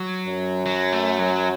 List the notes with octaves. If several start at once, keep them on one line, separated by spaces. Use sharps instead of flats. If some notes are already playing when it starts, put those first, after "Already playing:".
Already playing: F#3
F#2
F#3
A3
F#3